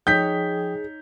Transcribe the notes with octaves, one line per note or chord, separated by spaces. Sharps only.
F3 D#4 G#4 C#5 G5 D#6 G6 B6